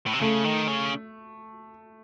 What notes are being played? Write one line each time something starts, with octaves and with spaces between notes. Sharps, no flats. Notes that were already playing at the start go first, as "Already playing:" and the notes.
A2
C3
C#3 A3
D#3
C#3